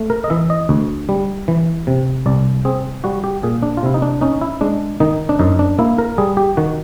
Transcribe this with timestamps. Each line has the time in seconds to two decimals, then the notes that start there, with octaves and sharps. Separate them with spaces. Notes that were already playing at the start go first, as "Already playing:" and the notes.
Already playing: A3
0.10 A#4
0.24 D#5
0.30 E3 E5
0.50 D#5
0.69 D2
1.09 G3
1.48 E3
1.87 C3
2.26 C2 D5
2.65 C4 G#4
3.04 G3 F#4
3.24 G4
3.43 A#2 G#4
3.63 D4
3.77 F4
3.83 C3 E4
3.94 D#4
4.02 D4
4.21 C#4 D#4
4.41 E4
4.61 G#3 D4
5.00 D#3 D#4
5.29 D4
5.39 F#2 D#4
5.59 D4
5.79 A#3 E4
5.98 A#4
6.18 G3 G#4
6.37 G4
6.57 D#3 F#4